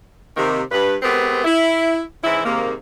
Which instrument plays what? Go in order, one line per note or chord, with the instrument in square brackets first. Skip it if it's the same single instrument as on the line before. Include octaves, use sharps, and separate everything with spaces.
[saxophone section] C3 D#3 A#3
G2 B4
G#3 B3 C4 G4 A#4 B4
E4
G#2 E3 C#4 E4
G#2 C3 D#3 A#3